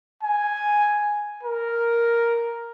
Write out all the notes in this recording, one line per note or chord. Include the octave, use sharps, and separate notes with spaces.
G#5
A#4